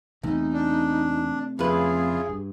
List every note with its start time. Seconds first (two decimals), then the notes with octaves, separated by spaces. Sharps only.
0.23 E2 C3 A3 C4 D#4
0.53 D4
1.59 F2 C#3 E4 F4 G#4 B4
2.29 G2